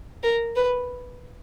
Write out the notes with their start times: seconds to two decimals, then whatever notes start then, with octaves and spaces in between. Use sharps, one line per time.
0.23 A#4
0.56 B4